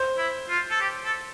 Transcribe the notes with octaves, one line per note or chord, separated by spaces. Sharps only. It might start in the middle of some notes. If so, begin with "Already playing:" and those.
Already playing: C5
E4
F4
A4
G4
A4